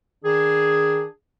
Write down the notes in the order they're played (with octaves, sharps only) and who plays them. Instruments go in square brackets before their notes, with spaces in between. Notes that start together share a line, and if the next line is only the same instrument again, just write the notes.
[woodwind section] D#3 D4 G#4